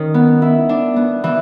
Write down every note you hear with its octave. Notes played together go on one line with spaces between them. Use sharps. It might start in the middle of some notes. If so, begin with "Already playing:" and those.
Already playing: D#3 C#4
B3
E4
D4
B3
E3